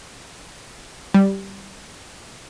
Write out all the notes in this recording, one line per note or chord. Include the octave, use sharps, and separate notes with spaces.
G3